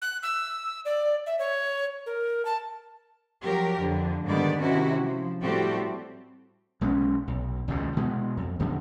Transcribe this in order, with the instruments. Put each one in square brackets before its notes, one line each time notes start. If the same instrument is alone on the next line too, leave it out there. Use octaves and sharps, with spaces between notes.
[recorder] F#6
E6
D5
E5
C#5
A#4
A5
[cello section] F3 F#3 G4 A#4
F2 D3
G#2 D3 D#3 G3 B3 D5
C3 D#3 C#4 E4 F#4
F3
A2 G3 C4 F#4 G4 A4
[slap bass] B1 G#3 B3 C#4
B1
G#1 C#2 G#2 B2
B2 G#3 B3
F2
D#1 F2 D3 B3